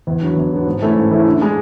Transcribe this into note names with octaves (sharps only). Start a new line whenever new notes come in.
E2
D3 F#3 B3
E2
D3 F#3 B3
G#2
E3 A3 C#4 E4
G#2
E3 A3 C#4 E4
D3
G#3 D4